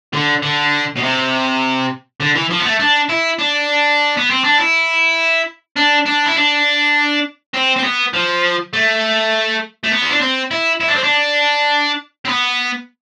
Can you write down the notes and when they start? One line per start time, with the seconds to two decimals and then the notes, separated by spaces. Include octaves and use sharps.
0.13 D3
0.42 D3
0.96 B2
1.02 C3
2.20 D3
2.35 E3
2.50 F3
2.60 B3
2.65 A3
2.80 D4
3.10 E4
3.39 D4
4.17 B3
4.30 C4
4.44 D4
4.58 E4
5.77 D4
6.06 D4
6.26 E4
6.36 D4
7.54 C4
7.77 C4
7.84 B3
8.13 F3
8.73 A3
9.84 A3
9.91 B3
10.02 E4
10.11 D4
10.21 C4
10.51 E4
10.80 E4
10.88 D4
10.95 C4
11.03 D4
12.25 C4
12.29 B3